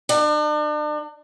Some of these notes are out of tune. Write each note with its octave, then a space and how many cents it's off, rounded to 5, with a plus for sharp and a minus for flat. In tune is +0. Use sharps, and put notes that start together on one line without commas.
D4 +40